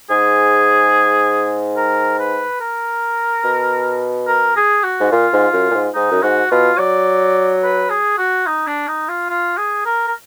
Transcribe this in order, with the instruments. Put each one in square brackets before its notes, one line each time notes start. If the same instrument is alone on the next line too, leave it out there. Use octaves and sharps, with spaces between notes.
[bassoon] G#2 [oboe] G#4
[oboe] A#4
B4
A#4
[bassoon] B2
[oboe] A#4
G#4
F#4
[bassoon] G#2
[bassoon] A#2 [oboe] F4
[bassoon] G#2
F#2
A#2
G#2
[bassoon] G#2 [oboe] D#4
[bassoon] F#2
[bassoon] G#2 [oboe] F#4
[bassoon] B2 [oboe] F4
[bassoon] F#3 [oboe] D5
[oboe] B4
G#4
F#4
D#4
D4
D#4
F4
F4
G#4
A#4
A#4